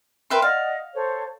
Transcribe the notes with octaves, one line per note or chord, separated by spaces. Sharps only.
A#4 B4 E5 G5 C6
D5 D#5 F5 F#5
A4 C5 C#5